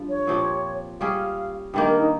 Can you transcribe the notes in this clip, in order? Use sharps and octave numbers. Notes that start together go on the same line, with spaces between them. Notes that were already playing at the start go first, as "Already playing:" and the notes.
Already playing: G2 F3
C#5
A#2 F3 C4 G4
G3 C#4 G#4 F5
G2 D#3 A#3 G5
A#4
D#4